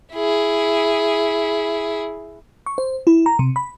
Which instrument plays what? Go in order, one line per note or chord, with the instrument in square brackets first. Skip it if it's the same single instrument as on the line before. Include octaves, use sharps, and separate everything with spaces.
[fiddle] E4 G#4
[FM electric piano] C#6
C5
E4
A#5
C3
B5